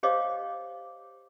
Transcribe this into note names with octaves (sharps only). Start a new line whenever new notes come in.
G4 C5 C#5 D#5 F5 D6